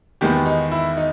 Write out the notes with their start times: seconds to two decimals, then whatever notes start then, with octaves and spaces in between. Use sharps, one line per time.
0.21 E2 D#3 G#3 B3 G4
0.46 D#4
0.71 E4
0.97 D#4